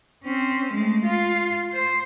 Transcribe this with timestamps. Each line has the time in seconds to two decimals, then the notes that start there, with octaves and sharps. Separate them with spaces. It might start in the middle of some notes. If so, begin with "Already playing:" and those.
0.24 C4 C#4
0.73 G#3 A3
1.05 F4
1.73 C5